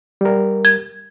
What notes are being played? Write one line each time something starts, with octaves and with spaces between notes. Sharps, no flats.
G3 A#4
G#6